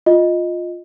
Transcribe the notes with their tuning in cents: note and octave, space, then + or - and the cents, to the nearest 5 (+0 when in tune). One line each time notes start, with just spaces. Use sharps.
F4 +10 D#5 +5